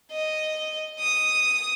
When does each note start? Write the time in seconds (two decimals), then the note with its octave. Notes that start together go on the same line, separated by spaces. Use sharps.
0.12 D#5
0.99 D#6